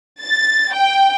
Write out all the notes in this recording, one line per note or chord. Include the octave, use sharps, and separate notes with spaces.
A6
G5